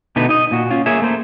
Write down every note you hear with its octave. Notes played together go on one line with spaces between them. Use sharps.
B2 D3 A3 B3 D#4 B4
D#4 D#5
A#2 F#4
C#4 F4
A#3 G#4 C#5 E5
A3 A#3 C5